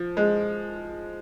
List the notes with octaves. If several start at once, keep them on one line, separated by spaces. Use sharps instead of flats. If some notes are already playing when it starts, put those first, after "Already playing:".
Already playing: F3
G#3